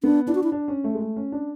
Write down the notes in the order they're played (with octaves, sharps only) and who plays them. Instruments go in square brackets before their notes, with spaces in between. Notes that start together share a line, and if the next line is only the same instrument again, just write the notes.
[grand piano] B3 [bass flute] D4
[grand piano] D4 [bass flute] E4
[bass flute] F#4
E4
[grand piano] D4
C#4
A3
G#3
A3
C#4
D4